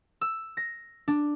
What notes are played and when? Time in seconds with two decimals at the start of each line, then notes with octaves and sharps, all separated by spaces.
0.21 E6
0.57 A#6
1.08 D4